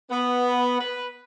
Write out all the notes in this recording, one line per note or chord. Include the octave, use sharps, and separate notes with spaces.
B3
B4